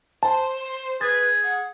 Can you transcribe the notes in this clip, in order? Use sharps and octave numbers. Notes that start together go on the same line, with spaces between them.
C5 A5
G#4 B4 A6
F#5